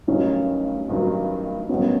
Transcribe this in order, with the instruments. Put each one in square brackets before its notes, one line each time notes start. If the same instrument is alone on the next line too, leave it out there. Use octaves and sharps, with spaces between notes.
[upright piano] A1 G2 D#3 F#3 [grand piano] C#4 D#4
[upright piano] A1 G2 D#3 F#3
[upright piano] A1 G2 D#3 F#3 [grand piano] B3 C#4